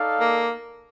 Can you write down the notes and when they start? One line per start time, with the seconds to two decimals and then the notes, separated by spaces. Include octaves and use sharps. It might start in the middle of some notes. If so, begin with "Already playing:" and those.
Already playing: D#4 A4 D5 F5
0.20 A#3